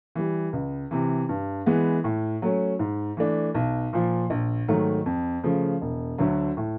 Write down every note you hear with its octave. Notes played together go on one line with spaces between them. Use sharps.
E3 G3
C#2
C3 E3
G2
E3 G#3 B3
A2
F#3 A3 C#4
G#2
E3 A3 D4
B1
A#2 F3
A#1
G#2 D#3 F#3 A3
F2
C#3 F3 A3
E1
D2 D3 F#3
A2